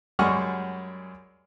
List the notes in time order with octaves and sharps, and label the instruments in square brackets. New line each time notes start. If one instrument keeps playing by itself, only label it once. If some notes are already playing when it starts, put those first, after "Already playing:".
[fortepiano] F#2 G3 G#3 F#5 C#6 F6